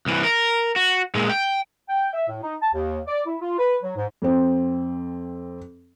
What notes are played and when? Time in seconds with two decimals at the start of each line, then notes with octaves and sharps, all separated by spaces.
0.06 C2 E3
0.24 A#4
0.76 F#4
1.15 A#2 G#3
1.29 G5
1.89 G5
2.13 E5
2.28 A2
2.43 D#4
2.61 A5
2.74 D#2
3.07 D5
3.27 E4
3.42 F4
3.59 B4
3.83 F#3
3.97 G#2
4.22 F2 C4